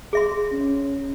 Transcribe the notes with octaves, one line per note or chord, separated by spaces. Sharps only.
G#4 E5 C6
C#4